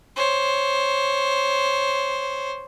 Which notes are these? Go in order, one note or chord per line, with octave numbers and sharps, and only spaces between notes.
C5 C#5